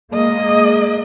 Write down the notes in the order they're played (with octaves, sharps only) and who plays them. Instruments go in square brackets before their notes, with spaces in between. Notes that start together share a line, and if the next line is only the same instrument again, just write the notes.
[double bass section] G#3 A#3 [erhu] D#5